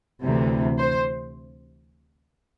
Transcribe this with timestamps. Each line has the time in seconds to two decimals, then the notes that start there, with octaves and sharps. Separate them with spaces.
0.23 D2 C3 E3
0.79 C5